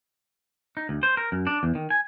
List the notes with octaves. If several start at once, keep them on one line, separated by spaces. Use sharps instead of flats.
D#4
D2
C5
A#4
F#2
D4
E2
D#3
G#5